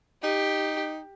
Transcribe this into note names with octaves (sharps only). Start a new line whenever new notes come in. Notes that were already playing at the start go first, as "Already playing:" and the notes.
D#4 G4